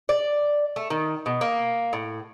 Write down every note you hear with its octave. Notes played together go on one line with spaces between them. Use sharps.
D5
A3
D#3
B2
A#3
A2